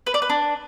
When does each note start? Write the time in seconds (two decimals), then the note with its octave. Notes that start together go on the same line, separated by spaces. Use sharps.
0.07 B4
0.14 D5
0.22 B4
0.30 D4